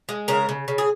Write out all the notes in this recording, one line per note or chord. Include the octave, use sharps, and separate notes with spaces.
G#3
C#3 A#4
C#3
C#3
G#4